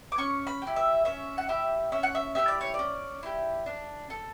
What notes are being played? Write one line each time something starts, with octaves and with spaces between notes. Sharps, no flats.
D6
C#4 C#6
B5
E4 G4
E5
C#4 E5
F#5
E4 G4 E5
C#4 E5
F#5
E5
E4 G4 E5
D5
C#5
C#4 D5
E4 G4
D4
A4